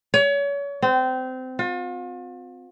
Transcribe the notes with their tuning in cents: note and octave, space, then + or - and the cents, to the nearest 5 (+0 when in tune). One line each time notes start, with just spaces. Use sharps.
C#5 +35
C4 -25
F4 +40